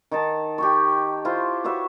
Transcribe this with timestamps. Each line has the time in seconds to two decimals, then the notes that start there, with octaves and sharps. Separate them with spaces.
0.11 D#3 D#4 A5
0.58 G4 G5 C#6
1.25 E4 F4 C5
1.64 F#4 B4 C#5 E5